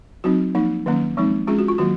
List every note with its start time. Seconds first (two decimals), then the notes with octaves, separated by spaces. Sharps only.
0.24 F#3 C4 D#4 F#4
0.55 F3 A#3 D#4
0.86 D#3 F#3 A#3 C#4
1.17 F3 G#3 C4 D#4
1.48 G#3 C#4 F4 G#4
1.59 F#4
1.68 F4
1.78 D#3 F#3 A#3 F#4